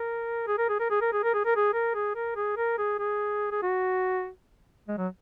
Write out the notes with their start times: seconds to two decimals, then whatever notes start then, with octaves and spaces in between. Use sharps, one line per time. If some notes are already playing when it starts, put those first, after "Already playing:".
Already playing: A#4
0.47 G#4
0.58 A#4
0.69 G#4
0.80 A#4
0.91 G#4
1.01 A#4
1.13 G#4
1.23 A#4
1.34 G#4
1.45 A#4
1.56 G#4
1.73 A#4
1.95 G#4
2.15 A#4
2.36 G#4
2.57 A#4
2.78 G#4
2.99 G#4
3.51 G#4
3.62 F#4
4.88 G#3
4.98 F#3